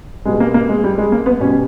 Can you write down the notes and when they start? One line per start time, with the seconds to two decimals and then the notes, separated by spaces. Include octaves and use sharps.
0.25 B2 G3 G#3
0.40 A#3
0.54 A#3
0.69 G#3
0.84 G3
0.98 G#3
1.12 A#3
1.26 B3
1.40 B2 G3 C#4